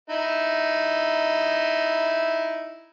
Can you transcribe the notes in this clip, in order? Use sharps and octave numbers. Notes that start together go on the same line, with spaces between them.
D#4 E4